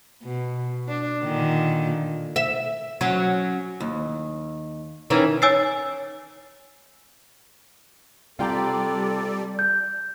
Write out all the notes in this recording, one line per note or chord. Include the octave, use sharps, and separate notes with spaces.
B2
D4
A#2 D3 D#3
E5
F#3 C#4
D#2
D#3 E3 C#4
C#5 G#5 E6 A6 C7
C3 G3 F4 A4 D5 G5 A#5
G6